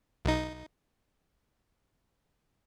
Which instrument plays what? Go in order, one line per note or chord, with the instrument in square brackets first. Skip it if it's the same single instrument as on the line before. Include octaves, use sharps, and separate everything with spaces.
[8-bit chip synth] B1 D#4